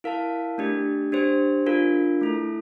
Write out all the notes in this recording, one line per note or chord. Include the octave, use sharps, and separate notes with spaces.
E4 A#4 F5 A5
A3 D4 G4
D4 G4 C5
D4 F4 A#4
A3 E4 A4